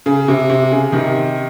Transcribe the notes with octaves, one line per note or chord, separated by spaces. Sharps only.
C#3
C3
C3
C#3
C3 D#3